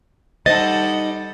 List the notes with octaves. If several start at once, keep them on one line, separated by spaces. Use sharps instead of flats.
G3 D#4 A4 C5 D#5 F#5 A6